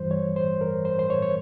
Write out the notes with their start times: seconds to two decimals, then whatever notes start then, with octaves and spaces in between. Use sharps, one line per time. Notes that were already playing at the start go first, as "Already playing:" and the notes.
Already playing: G2 E3 G3 C5
0.11 C#5
0.36 C5
0.61 A#4
0.85 C5
0.99 C5
1.10 C#5
1.22 C#5